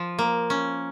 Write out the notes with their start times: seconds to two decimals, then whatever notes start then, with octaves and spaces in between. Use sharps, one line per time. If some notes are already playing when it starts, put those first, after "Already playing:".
Already playing: F3
0.19 A#3
0.50 C#4